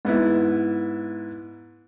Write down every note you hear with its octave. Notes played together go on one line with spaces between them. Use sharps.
G#2 B3 E4